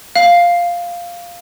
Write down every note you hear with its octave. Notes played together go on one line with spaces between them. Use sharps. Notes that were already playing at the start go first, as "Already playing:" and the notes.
F5